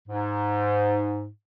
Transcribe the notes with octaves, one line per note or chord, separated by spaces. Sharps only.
G#2